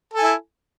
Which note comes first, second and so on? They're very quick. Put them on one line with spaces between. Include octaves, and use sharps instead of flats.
A4 G#5 E4